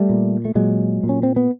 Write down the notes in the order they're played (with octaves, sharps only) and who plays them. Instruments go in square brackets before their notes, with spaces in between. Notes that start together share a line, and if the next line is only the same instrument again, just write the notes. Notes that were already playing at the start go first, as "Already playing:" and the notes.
Already playing: [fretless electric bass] G3 A3
A#2
A3
A#2 F#3 G#3
A#2
C#4
C4
B3